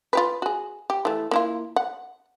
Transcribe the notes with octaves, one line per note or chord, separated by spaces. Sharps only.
F4 G4 B4
F#4 G#4
G4
E3 A3
A#3 E4 F4
F#5